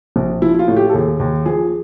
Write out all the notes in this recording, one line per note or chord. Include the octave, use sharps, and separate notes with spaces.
A#1
F3 E4
E4
F4
A2
G4
A4
D#2 G#4
D#2
F3 G#4